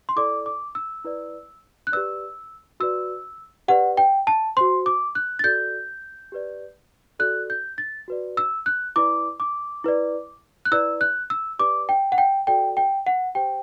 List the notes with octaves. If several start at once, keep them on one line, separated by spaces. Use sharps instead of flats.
C6
E4 A4 D5 D6
D6
E6
E4 B4 D5
F#6
G4 B4 D5 E6
F#4 B4 D5 E6
G4 B4 D5 F#5
G5
A5
F#4 C5 C6
D6
F#6
A6
F#4 A4 D5 G6
G4 B4 D5
F#4 A4 D5 F#6
G6
A6
F#4 B4 D5
E6
F#6
E4 B4 D5 D6
D6
E4 B4 D5
F#6
E4 B4 D5 E6
F#6
E6
G4 B4 D5 D6
G5
F#5
G5
F#4 A4 D5 G5
G5
F#5
G4 C5 G5